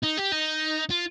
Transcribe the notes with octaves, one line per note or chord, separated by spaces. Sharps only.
D#4
G4
D#4
F4